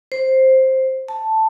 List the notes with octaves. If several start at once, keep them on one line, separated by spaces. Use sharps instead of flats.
C5
A5